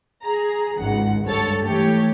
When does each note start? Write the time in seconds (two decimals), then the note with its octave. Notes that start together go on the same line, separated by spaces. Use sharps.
0.23 G#4 A#5
0.78 G#1 C#2 F#5
1.25 G2 A4 C#5 A6
1.63 E3 A3 G4 C#5